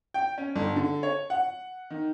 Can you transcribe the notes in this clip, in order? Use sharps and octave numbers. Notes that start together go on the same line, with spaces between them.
G5
C#4
G1
D3
C#5
F#5
D#3